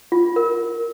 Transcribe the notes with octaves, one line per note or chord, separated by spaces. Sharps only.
F4
A#4